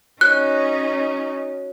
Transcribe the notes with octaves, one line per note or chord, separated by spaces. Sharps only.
C#4 D#4 F#4 C#5 F#6